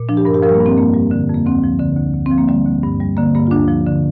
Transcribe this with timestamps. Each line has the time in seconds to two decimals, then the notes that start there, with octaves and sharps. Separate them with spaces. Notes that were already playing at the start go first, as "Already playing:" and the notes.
Already playing: A#2
0.09 F3 D4
0.17 G4
0.25 G2 A#4
0.34 G4
0.42 F3 A#4
0.49 G3
0.54 A#3
0.60 G2
0.66 C4
0.77 F2 A#3
0.94 G3
1.11 D3
1.29 F2 A#3
1.46 D2 C4
1.64 F3
1.80 D3
1.97 D2
2.14 D2
2.26 C4
2.32 F3
2.38 A#3
2.48 D3 G3
2.65 D2
2.83 G2
3.00 G3
3.17 D3 A#3
3.35 G2 A#3
3.47 F4
3.51 D2 D4
3.68 F3
3.86 D3